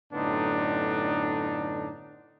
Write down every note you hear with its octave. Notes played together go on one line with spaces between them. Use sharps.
F#2 A2 D3 B3 D4 D#4